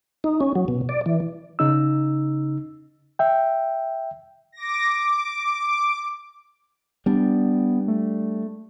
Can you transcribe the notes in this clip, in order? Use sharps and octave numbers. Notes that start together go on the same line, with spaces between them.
D#4
C#4
F#3
B2
D5
E3
C#3 D#4 E6
E5 G5
D6 A#6
D6
G3 B3 D4
A3